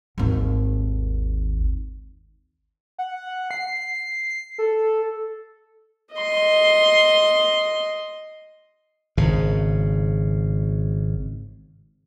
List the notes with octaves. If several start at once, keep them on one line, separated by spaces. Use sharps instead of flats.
G#1 D#2
F#5
C7
A4
D#5 C6
G#1 C#3